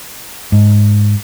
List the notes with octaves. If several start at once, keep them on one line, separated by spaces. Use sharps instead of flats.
G#2